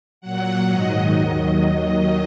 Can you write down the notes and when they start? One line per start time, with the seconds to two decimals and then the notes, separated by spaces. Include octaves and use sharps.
0.21 A#2 F#3 F#5
0.67 G#2 D#3 F#3 D#5
1.14 D#2 D#3 F#3